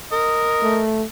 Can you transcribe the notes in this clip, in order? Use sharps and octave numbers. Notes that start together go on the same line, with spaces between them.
A#4 D#5
A3